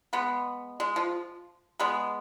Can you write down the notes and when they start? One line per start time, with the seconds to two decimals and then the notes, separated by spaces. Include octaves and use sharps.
0.13 G#3 B3
0.80 G#3
0.96 F3
1.80 G#3 B3